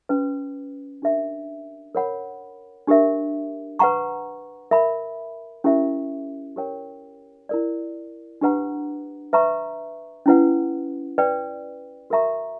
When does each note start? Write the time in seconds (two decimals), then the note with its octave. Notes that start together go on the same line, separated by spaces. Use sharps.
0.09 C#4 F#4 B4
1.02 D4 G4 A#4 E5
1.95 A#4 C#5 F#5 B5
2.87 D4 G4 A#4 E5
3.79 B4 F#5 A#5 C#6
4.71 A#4 E5 B5
5.64 C#4 E4 G4 A#4 E5
6.56 G4 A#4 C#5 G5
7.49 E4 A#4 D5
8.41 D4 G4 B4 F#5 A#5
9.33 B4 E5 A#5 C#6
10.26 C#4 E4 B4 F#5
11.18 B4 D5 G5
12.10 F#4 A#4 E5 A#5 C#6